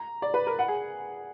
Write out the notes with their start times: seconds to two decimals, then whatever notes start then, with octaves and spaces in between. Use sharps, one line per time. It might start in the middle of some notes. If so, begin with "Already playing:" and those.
Already playing: A#5
0.22 D5
0.34 B4
0.47 A#4
0.59 F#5
0.68 G#4